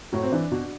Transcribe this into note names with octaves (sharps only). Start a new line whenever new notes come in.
A2 F#3 F#4
C4
E3 D4
B2